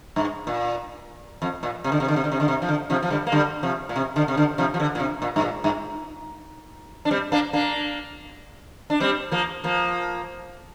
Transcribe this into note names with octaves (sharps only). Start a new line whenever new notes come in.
G2
A#2
F2
A#2
C3
D3
C3
D3
C3
D3
C3
D3
C3
F3
D3
C3 F3
F3
D3 G3
A#3
D3 G3
C3 F3
A#2
C3
D3
C3
D3
C3 F3
F3
D3
A#2
C3
A#2
G2
A#2
G2
D4
G3 C4
A#3 D4
A#3 D4
D4
G3 C4
F3 A#3
F3 A#3